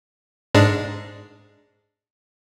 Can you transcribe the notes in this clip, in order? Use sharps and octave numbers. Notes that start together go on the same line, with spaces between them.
G#2 G#3 D4